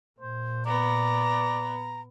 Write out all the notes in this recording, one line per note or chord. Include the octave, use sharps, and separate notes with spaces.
A#2 C5
B3 D5 A#5